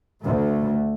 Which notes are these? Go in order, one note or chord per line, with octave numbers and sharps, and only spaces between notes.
D2 A3